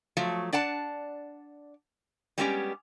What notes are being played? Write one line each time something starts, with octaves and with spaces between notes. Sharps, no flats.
F3 F#3 A3
D4 D5 F#5 A5
G3 G#3 B3 C#4 F4 G4